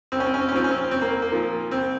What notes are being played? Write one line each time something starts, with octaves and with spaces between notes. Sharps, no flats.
C2 C4
C#4
C4
C#4
C4
C#4
A#2 F3 C4
C#4
C4
C2 C4
A#3
A#3
A#2 F3
C2 C4